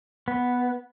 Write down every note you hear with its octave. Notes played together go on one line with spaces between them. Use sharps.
B3